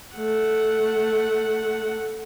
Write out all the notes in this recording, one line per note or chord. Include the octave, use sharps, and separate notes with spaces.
A3 F#5